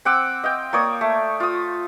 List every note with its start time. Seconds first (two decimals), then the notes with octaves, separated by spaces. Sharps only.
0.05 C4 F#5 D6 E6
0.44 D#5 F5 G5
0.73 A#3 C#5 D5 D#6
1.01 A3
1.40 F4 D#6